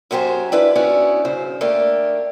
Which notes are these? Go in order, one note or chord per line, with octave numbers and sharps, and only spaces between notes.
F#2 F#4 G4 C5 G#5
D4 E4 B4 F5
B3 C#4 D4 E4 F#4
G2 C#3 C5
A3 A#3 D4 G4